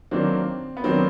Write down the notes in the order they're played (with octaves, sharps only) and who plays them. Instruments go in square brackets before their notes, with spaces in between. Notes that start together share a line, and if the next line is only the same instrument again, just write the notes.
[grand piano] D#3 F#3 A#3 D4 [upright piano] C4
[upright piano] B3
[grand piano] D#3 F#3 A#3 D4 [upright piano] C4